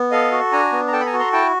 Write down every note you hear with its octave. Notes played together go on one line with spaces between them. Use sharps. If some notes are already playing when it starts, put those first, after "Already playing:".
Already playing: B3
A4 D#5 F5
F#4
D4 G#5 A#5
B3
A#5
A4 G5 A5
B5
G#5 A#5
F#4
A#5 C6
E4 G5 A5